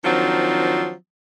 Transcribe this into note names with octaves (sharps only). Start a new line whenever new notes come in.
D#3 F3 F#3 C4 D4